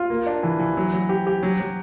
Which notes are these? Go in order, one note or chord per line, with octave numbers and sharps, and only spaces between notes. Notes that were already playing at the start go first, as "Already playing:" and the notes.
Already playing: F4
A#3
D4
E3
E3
F#3
F#3
G4
G4
F#3
F#3